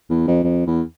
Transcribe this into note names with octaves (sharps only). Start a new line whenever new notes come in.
E2
F2
F2
E2